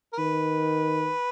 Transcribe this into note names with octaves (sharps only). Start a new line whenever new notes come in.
A#4
D#3 B4